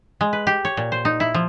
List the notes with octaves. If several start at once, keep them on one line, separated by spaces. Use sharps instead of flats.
G#3
B4
G4
C#5
A#2
C5
D#4
E4
F3